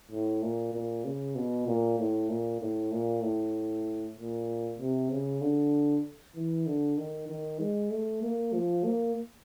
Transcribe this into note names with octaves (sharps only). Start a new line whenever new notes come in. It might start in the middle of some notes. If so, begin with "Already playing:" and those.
A2
A#2
A#2
C#3
B2
A#2
A2
A#2
A2
A#2
A2
A#2
C3
C#3
D3
E3
D3
D#3
D#3
G#3
A3
A#3
F3
A#3